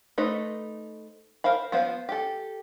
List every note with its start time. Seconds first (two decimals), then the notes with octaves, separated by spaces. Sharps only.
0.18 A3 D#4 B4 C5
1.44 A#4 C5 F5 B5
1.72 F3 B3 C5 F5
2.09 G4 A4